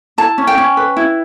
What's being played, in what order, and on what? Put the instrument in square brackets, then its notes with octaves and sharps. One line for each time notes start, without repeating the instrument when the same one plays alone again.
[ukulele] E4 A5
C#4
G5
C#4
B4
E4